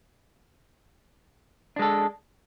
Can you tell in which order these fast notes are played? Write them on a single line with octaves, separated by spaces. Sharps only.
D4 G#3 A4